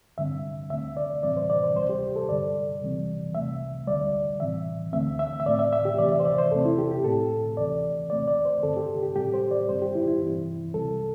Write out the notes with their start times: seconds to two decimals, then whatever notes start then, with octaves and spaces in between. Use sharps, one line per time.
0.17 G2 D3 G3 C4 E5
0.70 D2 D3 A3 C4 E5
0.97 D5
1.23 A2 E3 G3 C4 D5
1.37 C5
1.50 D5
1.63 C5
1.76 D2 C3 G3 C5
1.89 G4
2.16 A4
2.29 G2 D3 G3 D5
2.82 C2 C3 E3 G3 C4
3.35 C2 C3 A3 C4 E5
3.87 D2 D3 G3 D5
4.40 A2 E3 C4 E5
4.93 D2 D3 A3 C4 E5
5.19 E5
5.40 E5
5.46 A2 A3 C4 D5
5.59 E5
5.73 E5
5.85 G4
5.98 C2 C3 E3 A3 C4 D5
6.12 E5
6.20 C5
6.25 D5
6.38 C5
6.51 E2 C3 A3 C4 A4
6.65 E4
6.78 G4
6.91 G4
7.04 A2 A3 C4 A4
7.57 D2 C3 E3 C4 D5
8.10 E2 C3 A3 C4 D5
8.28 D5
8.45 C5
8.63 G2 D3 C4 A4
8.77 G4
9.03 G4
9.15 A2 G3 C4 G4
9.34 C5
9.51 D5
9.68 G2 G3 C4 C5
9.82 G4
9.95 E4
10.08 E4
10.21 G2 E3 C4
10.74 C2 C3 G3 C4 A4